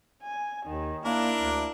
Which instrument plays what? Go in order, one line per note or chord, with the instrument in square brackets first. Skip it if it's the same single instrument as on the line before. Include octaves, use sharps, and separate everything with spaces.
[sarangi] G#5
[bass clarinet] D#2 [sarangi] D#3
[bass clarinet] A#3 [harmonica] D4 A#4 [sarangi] E4
[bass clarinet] D2